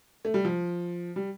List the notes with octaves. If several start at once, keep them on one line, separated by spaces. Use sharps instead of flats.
A3
G3
F3
G3